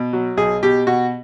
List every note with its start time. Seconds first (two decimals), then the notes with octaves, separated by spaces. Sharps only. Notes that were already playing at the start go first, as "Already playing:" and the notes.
Already playing: B2
0.13 F#3
0.37 B1 G#4
0.63 B2 G4
0.87 B2 F#4